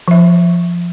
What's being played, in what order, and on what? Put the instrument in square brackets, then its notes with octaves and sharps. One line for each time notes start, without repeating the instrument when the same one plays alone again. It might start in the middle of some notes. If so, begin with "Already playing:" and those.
[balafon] F3 E5